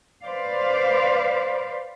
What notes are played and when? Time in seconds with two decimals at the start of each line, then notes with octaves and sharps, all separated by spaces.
0.24 B4 C5 D5 F5